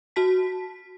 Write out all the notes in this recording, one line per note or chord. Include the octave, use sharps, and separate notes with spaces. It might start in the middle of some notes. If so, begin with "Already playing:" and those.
F#4 A5 B6